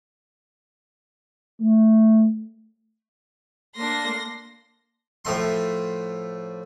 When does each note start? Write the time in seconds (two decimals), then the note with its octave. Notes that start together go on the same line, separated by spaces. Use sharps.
1.60 A3
3.76 A#3 D4 C6 A#6
5.25 A2 F3 A3 C6